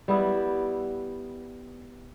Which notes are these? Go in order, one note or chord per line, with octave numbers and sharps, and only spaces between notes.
G3 B3 E4